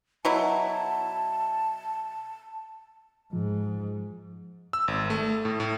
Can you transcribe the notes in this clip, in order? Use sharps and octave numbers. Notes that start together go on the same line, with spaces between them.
B2 F#3 E4 A5
G#2 F3
E6
G#1
A3
A2
A2